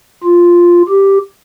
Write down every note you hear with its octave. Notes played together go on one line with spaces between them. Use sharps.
F4
G4